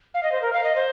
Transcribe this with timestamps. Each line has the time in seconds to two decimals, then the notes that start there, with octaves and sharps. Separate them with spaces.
0.14 F5
0.23 D#5
0.32 C5
0.42 A#4
0.53 F5
0.64 D#5
0.75 C5